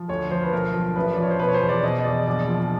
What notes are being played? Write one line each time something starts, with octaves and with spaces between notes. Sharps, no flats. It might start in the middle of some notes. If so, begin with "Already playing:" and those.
Already playing: F3
D2 C#5
F3 C5
B4
B1 A#4
F3
A1 B4
D5
F3 C#5
C5
B2 B4
C#5
C5
E2
D5
B2 D#5
D#5
E2 D5
A#1 D5
F3